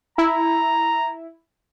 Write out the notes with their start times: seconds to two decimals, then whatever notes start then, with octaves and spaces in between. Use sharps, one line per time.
0.18 E4 A#5